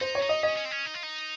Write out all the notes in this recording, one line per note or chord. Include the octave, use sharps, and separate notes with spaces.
D#4 C5
C#5
D#4
D#5
C#4 D#5
C#4
C4
C#4
D#4
F4
D#4